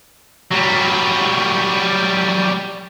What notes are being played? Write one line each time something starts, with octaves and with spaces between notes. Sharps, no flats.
F#3 G3